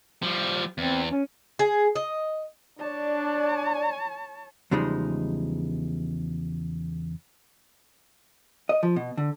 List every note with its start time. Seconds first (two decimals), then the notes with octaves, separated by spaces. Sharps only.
0.22 F3 G3
0.78 E2 C4
1.11 C#4
1.59 G#4
1.95 D#5
2.80 D4 C#5 D5 A5
4.71 E2 C#3 F3 G3 G#3 D#4
8.69 D#5
8.83 F3
8.96 B2
9.17 D3